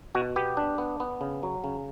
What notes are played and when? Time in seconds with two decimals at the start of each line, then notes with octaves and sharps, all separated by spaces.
0.15 B2 F#4
0.36 B3 G4
0.57 D4
0.78 B3
1.00 B3
1.21 C#3
1.43 F#3
1.64 C#3